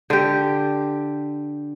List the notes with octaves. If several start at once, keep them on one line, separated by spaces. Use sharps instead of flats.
D3 G4